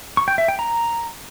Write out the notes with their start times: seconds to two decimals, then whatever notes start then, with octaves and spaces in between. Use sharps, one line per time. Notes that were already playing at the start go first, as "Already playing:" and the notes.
0.17 C#6
0.28 G5
0.38 E5
0.48 G5
0.59 A#5